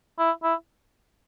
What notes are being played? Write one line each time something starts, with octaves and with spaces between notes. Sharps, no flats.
E4
E4